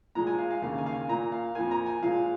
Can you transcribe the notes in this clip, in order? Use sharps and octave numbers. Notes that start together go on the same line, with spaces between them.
A#2 F3 G#3 A#5
G#5
F5
F5
D#2 C#3 A#3 F5
G#5
F5
G#5
A#2 A#3 A#5
F5
F2 F3 A#3 G#5
A#5
G#5
A#2 F3 G#3 F5